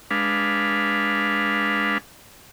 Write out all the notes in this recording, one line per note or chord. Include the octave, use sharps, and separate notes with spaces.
G#3 D4 B4 F5